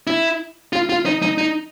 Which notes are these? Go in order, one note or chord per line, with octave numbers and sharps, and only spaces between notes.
E4
F4
F4
D#4
D#4
D#4